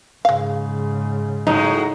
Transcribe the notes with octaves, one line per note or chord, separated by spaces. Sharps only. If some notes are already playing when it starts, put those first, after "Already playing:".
G#2 C#3 G#3 F5
A2 F#3 G#3 D#4